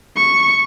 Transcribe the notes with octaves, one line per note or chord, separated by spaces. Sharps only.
C#6